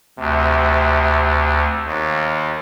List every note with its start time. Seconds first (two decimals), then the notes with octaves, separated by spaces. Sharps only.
0.19 D2 C3
1.87 D#2